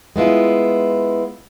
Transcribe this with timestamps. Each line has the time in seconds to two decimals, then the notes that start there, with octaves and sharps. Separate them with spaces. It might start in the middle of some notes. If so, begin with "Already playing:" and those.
0.16 G#3 B3 E4 F4